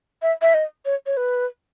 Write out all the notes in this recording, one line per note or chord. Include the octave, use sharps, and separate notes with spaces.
E5
E5
D#5
C#5
C#5
B4